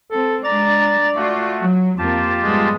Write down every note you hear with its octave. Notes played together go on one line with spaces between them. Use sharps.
C4 A4
G#3 D4 D5 A#5 A6
A3 F4 F#4
F#3
F2 A#3 F4 G4 A5
G#2 G3 G#3 B3